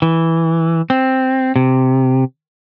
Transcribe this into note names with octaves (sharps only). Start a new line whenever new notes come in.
E3
C4
C3